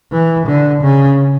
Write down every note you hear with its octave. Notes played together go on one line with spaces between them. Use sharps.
E3
D3
C#3